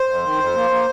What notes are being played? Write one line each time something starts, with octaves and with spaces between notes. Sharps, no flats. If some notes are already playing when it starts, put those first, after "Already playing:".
Already playing: C5
F2
D#3
F2
A#3
A#3